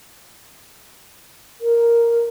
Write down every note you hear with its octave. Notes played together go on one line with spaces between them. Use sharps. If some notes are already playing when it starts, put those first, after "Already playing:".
A#4